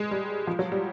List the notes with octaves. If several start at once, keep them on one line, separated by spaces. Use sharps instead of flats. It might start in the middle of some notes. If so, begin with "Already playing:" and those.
Already playing: G#3
G3
F3
F#3
G3